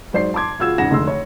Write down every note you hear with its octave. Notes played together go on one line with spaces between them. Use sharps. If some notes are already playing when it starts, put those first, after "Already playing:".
G#2 F#3 C5 D5 C7
A5 C6 D6 G#6
C#2 F4 F#4 E6 G#6 E7
E1 G#2 C#3 F#5 A#6 E7
F1 D3 C6 E6
C#5